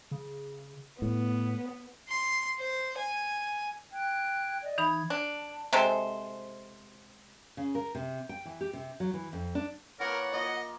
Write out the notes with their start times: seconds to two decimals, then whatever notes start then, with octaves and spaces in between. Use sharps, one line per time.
0.11 C#3
1.02 A2 B3
2.09 C6
2.59 C5
2.97 G#5
3.93 G5 F#6 G#6
4.63 D5 D#5
4.78 E3 D#4 B5 G#6
5.10 D4
5.73 C3 G#3 A4 C5
7.57 C#3
7.75 A#4
7.95 C3
8.29 G5
8.45 E3
8.61 G4
8.73 C3
9.00 F#3
9.14 E3
9.33 F2
9.55 D4
10.00 E3 A#3 A4 A#4 C#5 F#5
10.33 F3 A#3 D#5